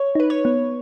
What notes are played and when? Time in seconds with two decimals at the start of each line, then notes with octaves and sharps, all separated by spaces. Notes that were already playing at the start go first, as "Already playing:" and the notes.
Already playing: C#5
0.15 D#4 B4
0.30 C#5
0.45 B3